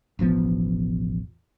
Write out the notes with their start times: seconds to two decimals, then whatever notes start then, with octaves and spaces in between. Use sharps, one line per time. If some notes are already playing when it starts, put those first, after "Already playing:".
0.19 E1 A1 F3 B3